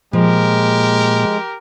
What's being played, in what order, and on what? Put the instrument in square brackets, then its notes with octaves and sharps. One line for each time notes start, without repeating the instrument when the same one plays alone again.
[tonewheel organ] A#2 [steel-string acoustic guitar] F3 [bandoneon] G#3 [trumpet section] G4 A#4